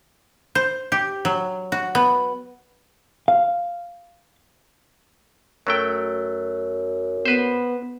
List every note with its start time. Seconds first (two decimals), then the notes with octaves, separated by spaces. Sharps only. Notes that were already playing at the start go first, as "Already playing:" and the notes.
0.55 C5
0.92 G4
1.25 F#3
1.72 F#4
1.95 B3
3.28 F5
5.67 F#2 F#3 A3 G5
7.26 B3 B4 C5